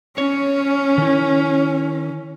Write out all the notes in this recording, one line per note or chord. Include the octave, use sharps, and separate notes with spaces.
C#4 C#5
D#3 E4